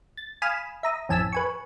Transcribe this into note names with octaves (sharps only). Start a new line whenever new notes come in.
A6
F5 G#5 B5 D#6 F6 E7
E5 A#5 D#6
A1 F2 G#5 A5 E6 B6
B4 G#5 C#6